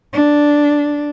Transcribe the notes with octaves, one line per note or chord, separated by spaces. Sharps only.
D4